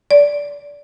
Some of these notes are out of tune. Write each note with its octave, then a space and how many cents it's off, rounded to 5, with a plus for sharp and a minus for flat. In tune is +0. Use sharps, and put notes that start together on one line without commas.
D5 -15